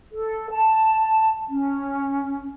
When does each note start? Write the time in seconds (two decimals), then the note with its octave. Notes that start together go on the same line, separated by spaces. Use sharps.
0.13 A4
0.50 A5
1.48 C#4